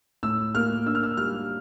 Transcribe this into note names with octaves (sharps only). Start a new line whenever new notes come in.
A2 E6
A#3 F6
D4 E6
F6
E6
G3 F6